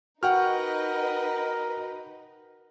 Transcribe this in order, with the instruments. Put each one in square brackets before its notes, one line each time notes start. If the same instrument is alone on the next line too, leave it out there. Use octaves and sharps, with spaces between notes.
[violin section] D#4 B4 D#5 [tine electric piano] F#4 [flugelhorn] A#4 [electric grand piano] F#5 G5 F6